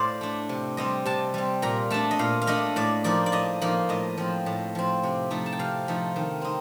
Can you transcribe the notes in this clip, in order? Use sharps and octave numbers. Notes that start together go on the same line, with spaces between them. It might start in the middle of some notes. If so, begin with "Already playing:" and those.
Already playing: A2 C5 D5 F5 A5
A3 D4
C3
G3 C4 D#5
C3 A5
G3 C4
A#2 A#5
A3 D4 A5
D#5
A#2 F5
F5
A3 D4 D#5
A2 D5
F3 A#3 D#4 D5
D5
A2 D#5
F3 A#3 D#4
A2 D#5
F3 C4
A2
F3 C4
C3
F3 A3 D#4
A5
G5
C3 F5
F3 A3 D#4
D#3
C4 D#4